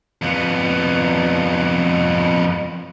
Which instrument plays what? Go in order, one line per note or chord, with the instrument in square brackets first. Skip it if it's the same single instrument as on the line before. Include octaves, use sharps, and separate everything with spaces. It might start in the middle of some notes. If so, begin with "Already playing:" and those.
[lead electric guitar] F2 B3